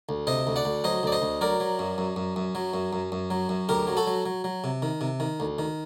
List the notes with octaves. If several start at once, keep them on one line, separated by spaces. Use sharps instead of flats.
D2
C3 C5 D#5
D2
D5 F#5
D2
F#3 C5 D#5
D2 D5
C5 D#5
D2
F#3 A#4 D5
F#3
F#2
F#2
F#2
F#2
F#3
F#2
F#2
F#2
F#3
F#2
D2 G4 A#4
F#3
F#4 A4
F#3
F#3
F#3
C3
D#3
C3
D#3
D2
D#3